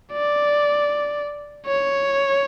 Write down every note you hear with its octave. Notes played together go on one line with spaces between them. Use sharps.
D5
C#5